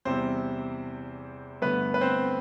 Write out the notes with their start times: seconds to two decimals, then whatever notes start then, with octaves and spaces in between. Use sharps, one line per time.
0.05 E2 C3 G3 C4 C5
1.62 G2 D3 A3 B3 B4
1.94 B4
2.01 C4 C5